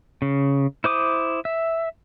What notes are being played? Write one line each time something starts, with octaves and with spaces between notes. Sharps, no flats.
C#3
E4 C5 D6 D#6
E5